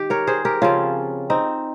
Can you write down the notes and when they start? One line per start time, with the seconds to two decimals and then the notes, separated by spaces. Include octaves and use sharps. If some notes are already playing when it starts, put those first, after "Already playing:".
Already playing: D#3 G4
0.10 A#4 C#5
0.27 G#4 C5
0.45 G4 A#4
0.62 C#3 F3 C4 C#4 F4
1.30 C4 D#4